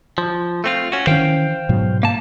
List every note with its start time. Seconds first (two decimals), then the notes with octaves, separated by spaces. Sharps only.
0.18 F3
0.64 A3 C4 F4
0.92 C#4 F#4
1.07 D#3 E3 C#4 C5 F5 G5
1.69 G#2 B2 F#3
2.03 A#3 A5